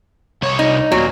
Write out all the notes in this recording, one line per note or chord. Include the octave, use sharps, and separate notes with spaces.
C2 C#5
D#4
D#2 A#2 F#3